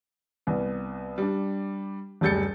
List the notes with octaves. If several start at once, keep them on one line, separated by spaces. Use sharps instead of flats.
C2 B3
G3 D4
F#1 D2 G3 G6 A6 C#7